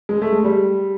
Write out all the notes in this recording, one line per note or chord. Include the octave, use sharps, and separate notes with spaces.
G#3
A3
G#3
G3